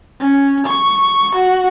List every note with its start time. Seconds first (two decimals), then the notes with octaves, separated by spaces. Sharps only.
0.20 C#4
0.67 C#6
1.36 F#4